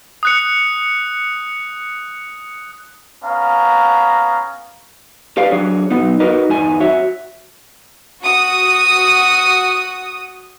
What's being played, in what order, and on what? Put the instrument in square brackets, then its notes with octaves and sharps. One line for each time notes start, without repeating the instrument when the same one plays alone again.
[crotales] D#6 F#6 C#7
[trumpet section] B3 C#4 F5 A#5
[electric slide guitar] G4 B4 D5 F5
F#3 D4 G#4 C#5
F#3 B3 D#4
D#4 F#4 A#4 B4 D#5
E2 G2 D#4 G#5
F#4 C#5 E5
[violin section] F#4 D#6